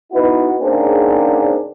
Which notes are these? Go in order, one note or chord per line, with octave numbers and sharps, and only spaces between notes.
B3 D#4 E4 F#4 B4
G#2 C#3 A#3 C4 D4 G#4